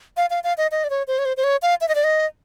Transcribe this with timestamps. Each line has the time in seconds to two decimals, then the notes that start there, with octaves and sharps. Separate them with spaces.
0.17 F5
0.30 F5
0.44 F5
0.58 D#5
0.71 D#5
0.84 D5
0.90 C#5
1.08 C5
1.19 C#5
1.25 C5
1.37 C5
1.44 C#5
1.62 F5
1.81 E5
1.88 D#5
1.95 D5
2.04 D#5